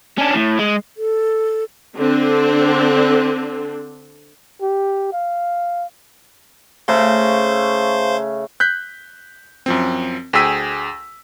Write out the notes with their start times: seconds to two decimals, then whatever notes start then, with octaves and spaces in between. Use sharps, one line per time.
0.18 C#4 D4
0.34 A2
0.59 G#3
0.97 A4
1.98 D3 C4 D4
4.62 G4
5.13 F5
6.88 C#3 A3 C5 F5 C6
8.60 F#6 G6 B6
9.66 F#2 F3 C4
10.33 D2 G#4 G5 E6 B6 D#7